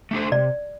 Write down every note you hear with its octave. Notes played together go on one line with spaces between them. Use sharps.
A3 D4 A4 C5
C3 D5